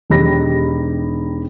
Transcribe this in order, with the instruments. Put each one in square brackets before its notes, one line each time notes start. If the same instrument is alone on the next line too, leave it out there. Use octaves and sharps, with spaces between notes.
[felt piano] E1 D#3 D#4 G4 B5 A#6